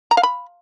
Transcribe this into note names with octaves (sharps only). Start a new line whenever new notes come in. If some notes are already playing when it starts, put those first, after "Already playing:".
A#5
F5
B5